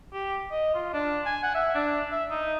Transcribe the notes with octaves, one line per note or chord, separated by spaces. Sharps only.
G4
D#5
F4
D4
G#5
F#5
E5
D4
E5
D#4